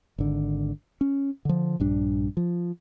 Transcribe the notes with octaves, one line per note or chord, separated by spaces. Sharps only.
G#1 D3
C#4
D3 F3
A#1 G2 D4
F3